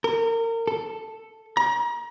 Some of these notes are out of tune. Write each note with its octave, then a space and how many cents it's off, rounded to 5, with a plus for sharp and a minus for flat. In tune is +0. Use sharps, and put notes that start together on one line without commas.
A#4 -30
A4 +5
A#5 +35